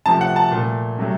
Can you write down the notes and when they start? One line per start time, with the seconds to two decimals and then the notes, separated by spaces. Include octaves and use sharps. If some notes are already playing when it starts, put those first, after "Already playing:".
0.06 C3 F3 A3 A5
0.21 F#5
0.36 A5
0.51 A#2 A3
0.98 C3 F#3 A3